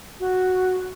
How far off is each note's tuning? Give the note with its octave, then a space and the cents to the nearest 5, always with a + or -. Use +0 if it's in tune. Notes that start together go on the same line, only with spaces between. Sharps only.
F#4 +0